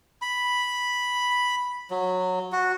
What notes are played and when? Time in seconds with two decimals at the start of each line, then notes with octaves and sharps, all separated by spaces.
0.22 B5
1.91 F#3
2.52 F#4